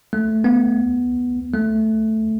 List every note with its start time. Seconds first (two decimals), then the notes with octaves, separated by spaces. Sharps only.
0.13 A3
0.44 B3
1.54 A3